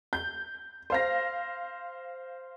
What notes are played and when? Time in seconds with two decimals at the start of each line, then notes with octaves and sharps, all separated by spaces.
0.13 G6
0.90 C5 F5 A#6